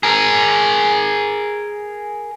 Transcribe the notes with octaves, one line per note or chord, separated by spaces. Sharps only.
G#4 A#4